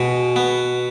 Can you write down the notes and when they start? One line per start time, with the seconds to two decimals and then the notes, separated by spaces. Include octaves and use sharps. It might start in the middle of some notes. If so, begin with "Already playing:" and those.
Already playing: B2 G#3
0.36 B3